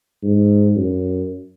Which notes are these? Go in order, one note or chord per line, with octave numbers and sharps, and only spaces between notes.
G#2
F#2